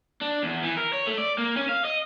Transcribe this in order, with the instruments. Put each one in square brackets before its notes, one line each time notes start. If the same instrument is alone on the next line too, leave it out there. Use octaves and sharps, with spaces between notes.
[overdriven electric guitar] D4
E2
E3
A#4
C#5
A3
D5
A#3
C#4
F5
D#5